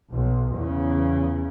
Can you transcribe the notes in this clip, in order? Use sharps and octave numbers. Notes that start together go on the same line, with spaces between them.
B1
E2 C#3